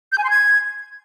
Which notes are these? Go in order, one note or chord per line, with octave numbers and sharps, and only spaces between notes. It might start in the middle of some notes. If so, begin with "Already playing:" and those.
G6
G#5
C6
G#6